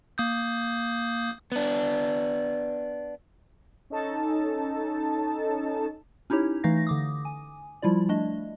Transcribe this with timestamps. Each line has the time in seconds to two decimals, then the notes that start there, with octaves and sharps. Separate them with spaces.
0.18 A#3 D#6 G6
1.52 B3 D4
3.90 C#4 D#4 A4 A5
6.30 C#4 D#4 E4 G4 C#5
6.64 E3 A3 D#4 F5 A#6
6.87 D3 D6 D#6
7.25 G#5
7.82 F3 G3 E4 F4 D5
8.09 A3 D4 D#5